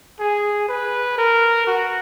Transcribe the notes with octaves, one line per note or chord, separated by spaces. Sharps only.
G#4
B4
A#4
F#4